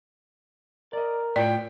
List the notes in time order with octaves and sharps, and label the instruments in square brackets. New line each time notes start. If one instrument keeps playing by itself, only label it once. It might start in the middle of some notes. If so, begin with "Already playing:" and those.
[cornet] A#4 [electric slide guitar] D5 D#5
[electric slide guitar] A2 F4 C#5 [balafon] D5 [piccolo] G5